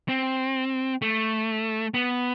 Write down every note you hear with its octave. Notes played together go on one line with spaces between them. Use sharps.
C4
A3
B3